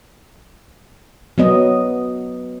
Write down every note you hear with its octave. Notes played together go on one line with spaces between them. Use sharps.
F#3 B3 D#5